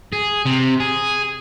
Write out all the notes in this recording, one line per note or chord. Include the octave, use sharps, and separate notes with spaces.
G#4
C3
G#4